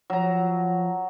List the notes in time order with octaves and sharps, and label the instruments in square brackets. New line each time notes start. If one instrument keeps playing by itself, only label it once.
[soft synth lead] F3 [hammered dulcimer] F#3 A#5